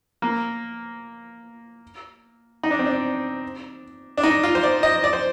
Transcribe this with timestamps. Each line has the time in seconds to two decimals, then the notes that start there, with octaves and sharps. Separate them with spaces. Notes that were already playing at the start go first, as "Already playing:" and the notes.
0.22 A#3
2.63 D#4
2.71 D4
2.79 C4
2.86 D4
4.18 D4
4.23 D#4
4.43 F4
4.55 C5
4.63 D5
4.83 D#5
5.04 D5
5.13 C5